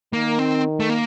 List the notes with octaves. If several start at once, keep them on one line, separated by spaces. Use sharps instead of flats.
D#3 A#3
C4
A3
A#3